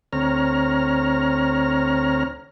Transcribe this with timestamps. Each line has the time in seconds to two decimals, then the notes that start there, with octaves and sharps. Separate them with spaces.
0.13 D2 C4 C#5 A#5 F6